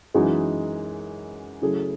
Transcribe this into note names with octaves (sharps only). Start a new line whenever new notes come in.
F#2 E3 G#3 D#4 F#4
C#3 F#3 A3 E4 G#4